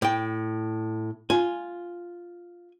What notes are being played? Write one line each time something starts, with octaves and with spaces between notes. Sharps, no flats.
A2 G5
F4 G#5